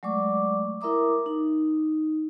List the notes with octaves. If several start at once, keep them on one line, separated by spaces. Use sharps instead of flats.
F#3 G#3 A3 D5 C#6 D6
E4 A#4 E5 A#5 D6 D#6
D#4